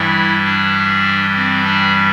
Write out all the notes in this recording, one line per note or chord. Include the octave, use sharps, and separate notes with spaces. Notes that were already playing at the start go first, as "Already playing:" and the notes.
Already playing: G2 E3 G3 E4
D4
C4
D4